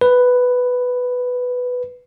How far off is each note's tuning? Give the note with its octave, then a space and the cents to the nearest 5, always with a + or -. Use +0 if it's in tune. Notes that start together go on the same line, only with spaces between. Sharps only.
B4 +5